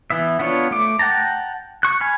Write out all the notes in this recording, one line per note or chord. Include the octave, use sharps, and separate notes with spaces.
E3 B3 E5
B3 D4 F4 C#5
A3 D6
F#5 G5 A5 A#5
C#6 F#6
G#5 B5 F6